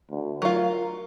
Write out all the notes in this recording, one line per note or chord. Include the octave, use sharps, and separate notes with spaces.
D2
F#3 F4 A#4